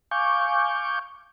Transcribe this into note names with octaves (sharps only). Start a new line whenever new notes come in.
F5 G#5 C#6 D6 G6